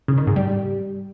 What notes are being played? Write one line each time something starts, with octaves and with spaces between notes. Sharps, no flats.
C#3
D#3
G#2
G3